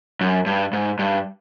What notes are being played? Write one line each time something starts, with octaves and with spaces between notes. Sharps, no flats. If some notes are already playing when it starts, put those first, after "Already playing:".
F#2
G2
G#2
G2